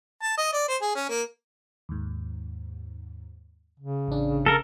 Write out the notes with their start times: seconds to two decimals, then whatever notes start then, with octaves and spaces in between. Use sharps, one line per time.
0.22 A5
0.37 D#5
0.53 D5
0.68 C5
0.81 G#4
0.95 C#4
1.09 A#3
1.89 D#2 G#2
3.80 C#3
4.08 A1 D4
4.46 A4 A#4